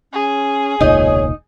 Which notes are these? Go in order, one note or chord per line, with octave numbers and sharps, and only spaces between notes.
C#4 G#4
E1 C#2 A#2 D#4 C#5 D#5